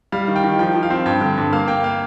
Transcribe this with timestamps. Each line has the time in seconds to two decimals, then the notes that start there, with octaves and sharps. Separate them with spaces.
0.12 G3 F5
0.28 D#3
0.36 G5
0.44 D#3
0.59 F3 G5
0.75 F3
0.83 F5
0.90 C4
1.06 G2 G5
1.21 D3
1.37 G2
1.52 A#3 F5
1.68 A#3 G5
1.84 F5